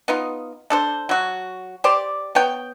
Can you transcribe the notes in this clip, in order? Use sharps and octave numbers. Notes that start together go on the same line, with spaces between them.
B3 D#4 F4
D4 A4 C5
F#3 F#4
G4 C5 D5
B3 C#5 G5